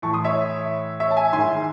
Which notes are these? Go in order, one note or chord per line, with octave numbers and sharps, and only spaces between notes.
A2 E3 A5 C#6
C6 D#6
C#5 E5
C#5 E5
A5
E5 G#5
G#2 D#3 G#5 C6